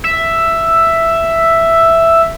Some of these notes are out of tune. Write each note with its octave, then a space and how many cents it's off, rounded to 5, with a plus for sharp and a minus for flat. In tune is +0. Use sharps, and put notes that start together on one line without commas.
E5 +5